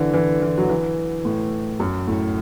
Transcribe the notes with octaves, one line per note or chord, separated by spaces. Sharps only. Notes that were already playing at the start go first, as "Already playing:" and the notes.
Already playing: D3 E3
E3
E3
F#3
E3
A2
F#2
A2